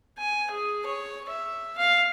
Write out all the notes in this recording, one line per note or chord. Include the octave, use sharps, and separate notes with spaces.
G#5
G#4
C#5
E5
F5